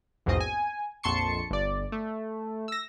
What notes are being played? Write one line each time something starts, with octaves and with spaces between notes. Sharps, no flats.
A#1 E2 G#2 B2 C4 D#5
G#5
A#1 F2 A5 C6 C#6 C#7
G1 D5
A3
E6 A#6